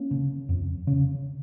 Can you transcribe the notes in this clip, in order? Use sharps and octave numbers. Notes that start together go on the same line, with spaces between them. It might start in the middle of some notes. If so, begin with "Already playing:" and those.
Already playing: A#3 C#4
C#3
F2
C#3